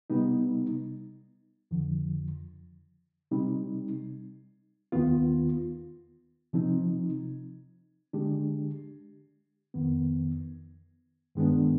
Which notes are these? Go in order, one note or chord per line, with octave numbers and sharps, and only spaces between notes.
C3 G3 B3 D#4
F2 D3 F3
C3 G3 C4 D#4
D#2 D#3 B3 F4
C3 F3 C4 D#4
D3 G#3 D4 G4
F2 D#3 B3
G2 D#3 G#3 B3 D4